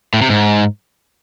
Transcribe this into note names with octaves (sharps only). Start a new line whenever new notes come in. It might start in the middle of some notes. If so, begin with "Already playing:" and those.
A2
C3
G#2